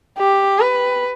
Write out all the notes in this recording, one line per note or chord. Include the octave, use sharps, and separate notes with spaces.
G4
B4